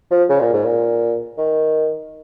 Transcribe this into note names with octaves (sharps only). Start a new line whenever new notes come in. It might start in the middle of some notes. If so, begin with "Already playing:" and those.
F3
C#3
A#2
G#2
A#2
D#3